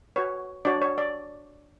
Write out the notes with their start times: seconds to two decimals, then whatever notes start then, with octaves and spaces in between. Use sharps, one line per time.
0.16 F#4 B4 C#5
0.65 D4 F#4 C#5 D5
0.82 C#5
0.98 D5